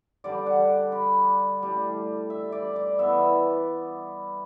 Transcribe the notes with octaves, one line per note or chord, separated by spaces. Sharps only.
D3 G3 D4 D5
F#5
B5
A2 G3 D4
E5
D5
D5
E3 B3 E4 E5